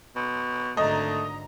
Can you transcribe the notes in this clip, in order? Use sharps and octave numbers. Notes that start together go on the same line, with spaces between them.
B2
G#1 D3 A3 D#5 A#5